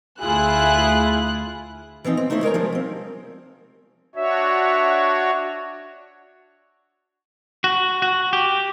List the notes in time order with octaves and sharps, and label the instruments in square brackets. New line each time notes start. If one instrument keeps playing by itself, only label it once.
[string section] D2 E4 F4 G#4 F#6
[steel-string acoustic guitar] E3 F3 C4 D#4
C4
A3 D#4 E4 C5 C#5
G#3 A#4 C#5 A#5
F3 G3 G#3
F3 C4
[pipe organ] D4 F#4 C#5 [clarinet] E5
[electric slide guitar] F#4
F#4
G4